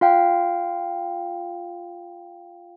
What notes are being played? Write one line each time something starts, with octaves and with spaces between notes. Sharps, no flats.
F4 F5 G5